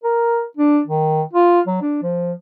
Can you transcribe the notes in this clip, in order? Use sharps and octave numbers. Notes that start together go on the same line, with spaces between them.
A#4
D4
D#3
F4
F#3
D4
F3